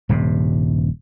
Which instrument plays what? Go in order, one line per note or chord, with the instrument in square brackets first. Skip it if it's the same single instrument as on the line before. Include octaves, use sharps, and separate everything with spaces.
[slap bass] D#1 G2 C3